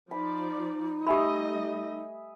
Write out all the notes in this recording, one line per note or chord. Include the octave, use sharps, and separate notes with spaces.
F3 D#4 D5 B5
G3 A3 G4 D#5 E5 G#5 B5 D#6